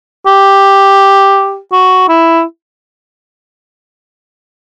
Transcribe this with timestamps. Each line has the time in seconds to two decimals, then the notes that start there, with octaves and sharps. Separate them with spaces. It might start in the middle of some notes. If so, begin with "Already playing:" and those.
0.26 G4
1.72 F#4
2.09 E4